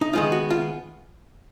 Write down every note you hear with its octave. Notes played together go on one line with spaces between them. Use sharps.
D#4
D#3 G#3 B3 D#4 F4
F#4
F4